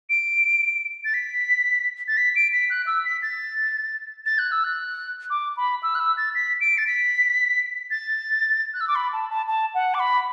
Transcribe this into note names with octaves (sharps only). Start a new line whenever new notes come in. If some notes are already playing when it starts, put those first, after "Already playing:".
D7
A6
B6
A6
B6
D7
B6
F#6
E6
B6
A6
A6
F#6
E6
F#6
D6
B5
E6
F#6
E6
A6
B6
D7
A6
B6
A6
F#6
E6
D6
B5
A5
A5
A5
F#5
D6
B5